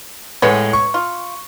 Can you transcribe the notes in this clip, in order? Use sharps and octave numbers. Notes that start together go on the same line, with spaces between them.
A2 G#3 B3 C#5
C#6
F4